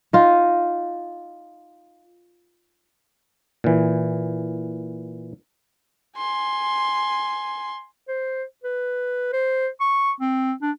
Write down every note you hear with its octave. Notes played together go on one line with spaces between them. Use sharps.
D#4 F4
A#2 E3
G#5 C6
C5
B4
C5
C#6
C4
D4